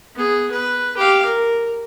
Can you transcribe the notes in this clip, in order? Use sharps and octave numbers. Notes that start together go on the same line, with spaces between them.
B3 G#4
B4
G4 F5
A#4